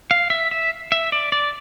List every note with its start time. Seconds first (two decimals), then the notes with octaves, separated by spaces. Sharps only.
0.11 F5
0.30 E5
0.51 E5
0.92 E5
1.12 D5
1.32 D5